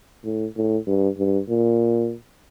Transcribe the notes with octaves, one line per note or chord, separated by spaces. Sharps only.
A2
A2
G2
G2
A#2